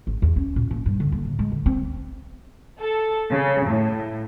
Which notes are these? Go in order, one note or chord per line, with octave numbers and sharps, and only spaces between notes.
G#1
E2
C#4
A#2
A#3
G2
D3
A#3
A2
G#3
D3
C4
A4
C#3
A2